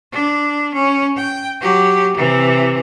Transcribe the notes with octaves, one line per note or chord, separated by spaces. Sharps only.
D4
C#4
G5
F#3 G4
C3 E3